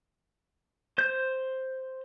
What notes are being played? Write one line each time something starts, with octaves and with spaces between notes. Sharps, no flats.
C5 G6